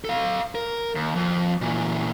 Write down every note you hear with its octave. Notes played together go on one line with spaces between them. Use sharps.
A4 F5
A#4
D#2
F2
A#2 E3